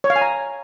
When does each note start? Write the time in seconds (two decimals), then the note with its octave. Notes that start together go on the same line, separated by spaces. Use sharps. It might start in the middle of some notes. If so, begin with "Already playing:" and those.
0.04 C#5
0.10 F5
0.16 G#5
0.22 A#5